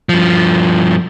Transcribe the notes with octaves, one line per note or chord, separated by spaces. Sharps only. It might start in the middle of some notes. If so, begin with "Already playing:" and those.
G2 F3